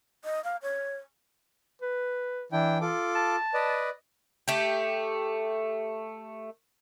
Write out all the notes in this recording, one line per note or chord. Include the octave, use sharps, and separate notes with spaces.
D#5
F5
C#5
B4
E3 D4 E4 G5
F4 A4 D6
A5
B4 D5 D#5
A3 G4